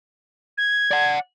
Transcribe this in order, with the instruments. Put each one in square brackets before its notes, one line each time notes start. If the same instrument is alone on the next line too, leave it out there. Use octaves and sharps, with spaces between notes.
[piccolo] G#6
[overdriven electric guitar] D5 F#5